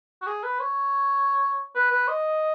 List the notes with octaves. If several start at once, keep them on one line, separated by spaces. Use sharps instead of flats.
F#4
G#4
B4
C#5
B4
B4
D#5